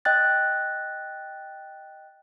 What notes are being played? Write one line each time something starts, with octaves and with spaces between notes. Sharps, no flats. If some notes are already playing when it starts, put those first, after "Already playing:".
D#5 G5 F#6 A6